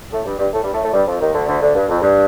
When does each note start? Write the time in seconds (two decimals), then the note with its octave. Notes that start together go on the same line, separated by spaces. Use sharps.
0.12 A2 A3
0.26 G2 G3
0.39 G2 G3
0.53 A2 A3
0.63 G2 G3
0.73 A2 A3
0.83 A2 A3
0.93 G2 G3
1.07 F2 F3
1.21 D#2 D#3
1.34 D2 D3
1.48 D2 D3
1.62 D2 D3
1.75 G2
1.89 F2
2.02 G2